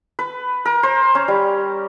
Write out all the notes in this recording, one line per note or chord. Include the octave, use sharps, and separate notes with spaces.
B4
A#4
C5
C#4
G3